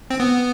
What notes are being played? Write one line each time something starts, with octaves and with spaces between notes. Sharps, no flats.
C4
B3